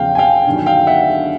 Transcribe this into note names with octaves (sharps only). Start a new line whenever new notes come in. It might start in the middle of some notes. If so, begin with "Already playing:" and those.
Already playing: E2 C#3 F3 F5 G5
G#5
F5 G5
G1 G2 D#3 F#3
F5 G5
E5 F#5